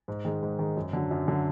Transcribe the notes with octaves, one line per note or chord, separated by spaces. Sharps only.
G#2
D#3 G#3
G#2
D#3 G#3
F#2
D3 F#3
F#2
D3 F#3